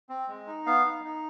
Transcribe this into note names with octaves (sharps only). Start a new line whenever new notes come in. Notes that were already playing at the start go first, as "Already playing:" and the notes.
C4
G#3
D#4
B3 F5
D#4
D#4